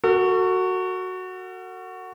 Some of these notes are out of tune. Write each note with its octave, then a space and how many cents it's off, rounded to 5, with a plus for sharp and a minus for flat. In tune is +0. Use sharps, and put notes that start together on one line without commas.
F#4 +0 A4 +45